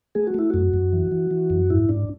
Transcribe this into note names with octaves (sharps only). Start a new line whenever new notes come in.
A3 G#4
F#4
A3 E4
F#2 F#4
F#2
E3
E3
E3
F#2
G#2 E4
G#2 D4